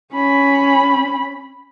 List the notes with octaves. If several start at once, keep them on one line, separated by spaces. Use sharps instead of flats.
C#4 B5